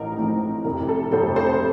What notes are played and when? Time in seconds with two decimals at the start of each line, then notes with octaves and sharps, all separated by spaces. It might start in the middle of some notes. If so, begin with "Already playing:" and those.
Already playing: A1 A2 F3 D#4 A#4
0.18 A1 A2 F3 C4 D#4
0.64 F1 F2 C3 A#4
0.89 A4
1.12 F1 F2 C3 A4 C5
1.36 A4 C5